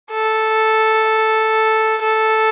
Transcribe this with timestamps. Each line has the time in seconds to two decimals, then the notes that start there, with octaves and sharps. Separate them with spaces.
0.11 A4
2.02 A4